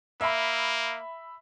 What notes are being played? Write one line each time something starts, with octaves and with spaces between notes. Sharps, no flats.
A#3 E5 B5